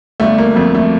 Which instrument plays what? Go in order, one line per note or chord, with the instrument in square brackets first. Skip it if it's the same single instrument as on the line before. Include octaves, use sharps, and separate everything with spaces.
[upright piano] G1 A3
A#3
F2 A3
A3